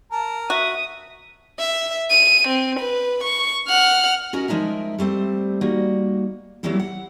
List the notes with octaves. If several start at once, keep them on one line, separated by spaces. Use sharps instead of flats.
A#4 A5
F#4 E5 D#6
E5
D#7
C4
B4
C#6
F#5 F6
C#4 F#4 A#4 D#5
F3 G#3 D#4 A#4 E5
G3 A3 C4 C5
G3 A#3 D#4 F#4
F#3 G3 A3 A#3 C4 E4
F#5